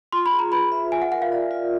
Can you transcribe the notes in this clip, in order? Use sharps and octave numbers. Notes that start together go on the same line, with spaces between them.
F4 C6
B5
G#4
A#5
B4 B5
E5
F4 G#5
F#5
A#4 F#5
F5
D5
F4